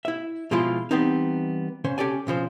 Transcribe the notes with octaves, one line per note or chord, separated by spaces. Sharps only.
E4 E5
B2 F3 G#3 E4 F4
E3 G3 B3 C4 D#4
C#3 C#4 C5
C#4 G4 A4 D5 G#5
B1 C#3 F3 C5